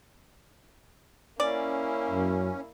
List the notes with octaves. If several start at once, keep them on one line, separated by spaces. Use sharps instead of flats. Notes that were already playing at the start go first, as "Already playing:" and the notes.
A#3 C#4 E4 D5
F#2